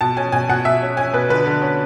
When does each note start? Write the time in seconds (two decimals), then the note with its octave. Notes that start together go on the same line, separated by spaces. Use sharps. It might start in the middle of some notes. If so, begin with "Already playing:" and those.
0.01 B2 A5
0.17 C#4 G#5
0.32 B2 G#5
0.49 B2 F#5
0.65 B2 E5
0.82 C#4
0.97 C#4 G#5
1.13 B2 B4
1.29 D3 B4
1.46 D3
1.62 C#4